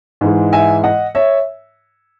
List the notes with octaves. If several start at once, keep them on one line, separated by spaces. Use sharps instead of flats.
G#2 E3 G#3
E5 G#5
D#5 F#5
C#5 E5